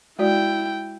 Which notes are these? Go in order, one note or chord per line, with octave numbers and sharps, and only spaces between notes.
G#3 E4 F#4 D5 G5